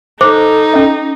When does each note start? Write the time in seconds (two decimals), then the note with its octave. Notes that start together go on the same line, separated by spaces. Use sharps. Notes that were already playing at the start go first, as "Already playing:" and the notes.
0.21 D#4 A4 C5 D6
0.74 C#4 D#5